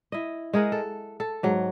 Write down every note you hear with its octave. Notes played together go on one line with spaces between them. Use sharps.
E4 D#5
G#3 G#4 A#4 F#5
A4
A4
G#2 F#3